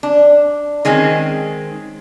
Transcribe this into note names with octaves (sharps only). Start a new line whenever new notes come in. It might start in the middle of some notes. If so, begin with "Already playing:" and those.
D4
D#3 G#3 C4 C#4